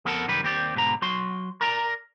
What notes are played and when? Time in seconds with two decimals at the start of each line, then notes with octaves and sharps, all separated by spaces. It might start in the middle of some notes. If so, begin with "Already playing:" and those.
0.05 F2 B3 A4 A#4 F#5 A5
0.28 C2 F#2 D#3 G3 B4
0.43 D#2 C4 G4 D5
0.76 G#2 B2 D3 A#5
1.02 F#3 F#4 C6
1.61 A#4 D5 A#5